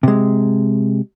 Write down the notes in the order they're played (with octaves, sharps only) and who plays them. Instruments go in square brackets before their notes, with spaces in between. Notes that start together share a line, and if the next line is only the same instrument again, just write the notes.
[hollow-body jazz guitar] C3 G#3